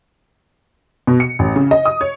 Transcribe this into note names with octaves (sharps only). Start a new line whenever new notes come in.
B2
C#7
A1
C#3
D#5
D#6
C#5